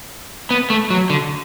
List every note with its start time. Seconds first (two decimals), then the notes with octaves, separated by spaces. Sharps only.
0.51 B3
0.70 A3
0.90 F#3
1.10 D3